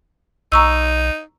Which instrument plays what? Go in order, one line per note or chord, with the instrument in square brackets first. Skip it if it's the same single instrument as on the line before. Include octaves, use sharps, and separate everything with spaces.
[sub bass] B1 [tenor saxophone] D#4 [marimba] A#5 C#6 E6